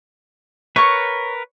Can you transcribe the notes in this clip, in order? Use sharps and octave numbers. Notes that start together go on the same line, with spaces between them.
A#4 B4 C#5 C#6